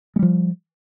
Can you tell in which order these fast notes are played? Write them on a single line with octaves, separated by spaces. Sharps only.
G#3 G3 F3